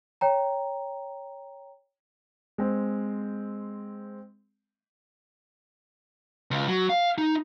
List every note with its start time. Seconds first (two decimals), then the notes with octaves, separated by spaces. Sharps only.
0.21 C#5 G5 A#5
2.58 G#3 C4
6.51 C#2
6.68 F#3
6.90 F5
7.18 D#4